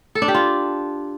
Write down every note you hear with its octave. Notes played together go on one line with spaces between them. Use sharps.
A4
D4
G4
F4